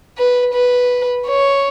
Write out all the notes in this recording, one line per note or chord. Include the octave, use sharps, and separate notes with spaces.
B4
B4
C#5